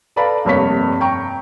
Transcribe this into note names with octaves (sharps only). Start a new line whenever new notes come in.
A4 B4 D5 F5 A#5 B5
F1 G2 A#3 C#5 C#6 B6
G5 A#5 C#6